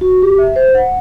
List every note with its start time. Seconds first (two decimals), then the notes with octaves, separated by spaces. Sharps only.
0.01 F#4
0.22 G4
0.38 E5
0.56 C5
0.75 F#5